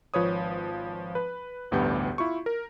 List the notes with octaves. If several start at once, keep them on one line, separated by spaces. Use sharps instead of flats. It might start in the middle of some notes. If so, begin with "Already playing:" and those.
G#1 F3 B4 C#5 D#6
B4
A1 D2 G2 B3 G4 G6
E4 F4 C#6
A#4